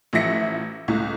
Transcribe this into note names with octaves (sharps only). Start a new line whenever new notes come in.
A1 F3 E5 A#6 C#7
C#2 A2